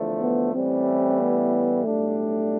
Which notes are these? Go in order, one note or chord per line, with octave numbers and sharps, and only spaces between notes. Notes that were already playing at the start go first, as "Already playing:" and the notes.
Already playing: E2 D3 F3 A3
B3
A1 A2 E3 G3 C4
B3
B1 A2 G3 A3 D4